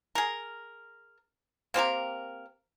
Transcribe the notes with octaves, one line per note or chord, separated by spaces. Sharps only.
G#4 A#4
A#3 C4 G4 A#4